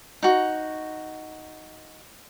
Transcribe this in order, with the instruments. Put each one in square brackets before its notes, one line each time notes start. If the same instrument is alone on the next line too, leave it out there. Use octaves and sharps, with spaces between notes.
[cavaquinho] D#4 F#4